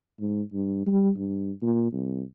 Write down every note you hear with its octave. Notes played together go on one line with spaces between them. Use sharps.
G#2
G2
G3
G2
A#2
C2